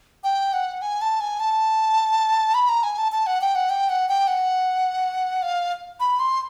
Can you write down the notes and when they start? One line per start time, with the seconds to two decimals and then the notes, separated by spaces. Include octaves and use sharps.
0.24 G5
0.53 F#5
0.82 G#5
1.02 A5
1.20 G#5
1.40 A5
2.54 B5
2.69 A#5
2.83 G#5
2.98 A5
3.12 A5
3.27 F#5
3.41 G5
3.55 F#5
3.70 G5
3.89 F#5
4.09 G5
4.27 F#5
5.42 F5
6.00 B5
6.19 C6